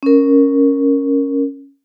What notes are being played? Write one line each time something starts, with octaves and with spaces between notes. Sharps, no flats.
C#4 A#4